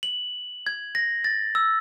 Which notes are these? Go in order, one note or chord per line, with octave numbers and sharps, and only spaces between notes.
F#7
G#6
A#6
A6
E6